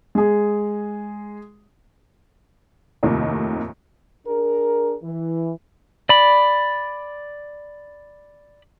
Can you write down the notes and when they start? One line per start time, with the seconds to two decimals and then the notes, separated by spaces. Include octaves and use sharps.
0.15 G#3 G#4
3.03 F1 D#2 A2 C3 D#3 F3
4.26 D4 G#4 A#4
5.03 E3
6.09 D5 B5